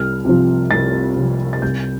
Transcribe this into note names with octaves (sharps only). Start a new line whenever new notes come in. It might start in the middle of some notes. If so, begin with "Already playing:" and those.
Already playing: C2 F6
C3 F3
C2 A6
C3 F3
A6
C2 G6